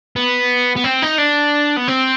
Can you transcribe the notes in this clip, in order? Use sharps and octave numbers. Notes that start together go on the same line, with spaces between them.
B3
B3
C4
D#4
D4
B3
C4